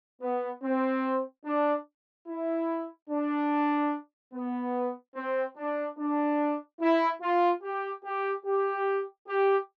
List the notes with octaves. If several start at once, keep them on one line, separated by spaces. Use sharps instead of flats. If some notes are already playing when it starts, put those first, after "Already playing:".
B3
C4
D4
E4
D4
B3
C4
D4
D4
E4
F4
G4
G4
G4
G4